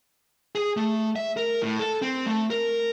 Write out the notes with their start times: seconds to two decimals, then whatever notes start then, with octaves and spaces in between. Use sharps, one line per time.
0.55 G#4
0.77 A3
1.16 E5
1.37 A#4
1.62 A2
1.80 A4
2.02 C4
2.26 A3
2.50 A#4